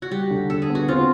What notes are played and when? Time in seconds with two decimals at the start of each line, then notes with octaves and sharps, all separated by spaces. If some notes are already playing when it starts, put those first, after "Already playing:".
0.02 F#4
0.11 G3 G4
0.30 D3
0.49 D3 A4
0.62 G#4
0.69 B3
0.75 F#4
0.88 C4 F4